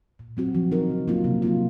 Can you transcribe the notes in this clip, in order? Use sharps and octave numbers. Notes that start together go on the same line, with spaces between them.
A#2
F#3 C4 F#4
F3
C4 D#4 A#4
C#3
F#3 A#3 F4
C3
F#3 A#3 F4